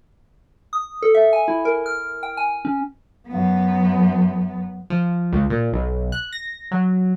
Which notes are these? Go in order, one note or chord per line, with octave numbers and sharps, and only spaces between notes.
D#6
A4
E5
G#5
E4
A#4
F6
G5
G#5
C#4
F#2 B3
F3
C#2
A#2
B1
F#6
A#6
F#3